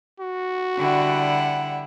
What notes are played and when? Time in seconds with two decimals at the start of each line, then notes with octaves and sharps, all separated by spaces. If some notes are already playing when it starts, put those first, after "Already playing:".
0.20 F#4
0.77 D3 G3 E4 F#5